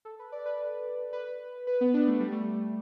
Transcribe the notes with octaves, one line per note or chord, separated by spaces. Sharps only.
A4
B4
D5
B4
B4
B4
B3
D4
A3
G3
A3